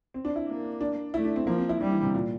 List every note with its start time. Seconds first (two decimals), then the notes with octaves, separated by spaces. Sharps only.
0.14 C4
0.25 D4
0.36 E4
0.47 A#3
0.81 D4
1.14 A3 E4
1.25 D4
1.36 C4
1.47 F3 A#3
1.59 C4
1.69 E4
1.80 G3 D4
1.92 E3
2.03 C3
2.14 A#2